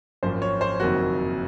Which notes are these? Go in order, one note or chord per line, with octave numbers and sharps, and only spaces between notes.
G#1 F#2 F3 A#3 C5
C#5
C5
F#1 F2 D#3 F#3 A#3 F#4